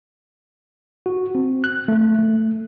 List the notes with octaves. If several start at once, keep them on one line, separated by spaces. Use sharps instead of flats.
F#4
C4
F#6
A3
A3